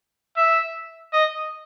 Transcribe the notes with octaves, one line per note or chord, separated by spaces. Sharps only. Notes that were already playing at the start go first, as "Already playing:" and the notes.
E5
D#5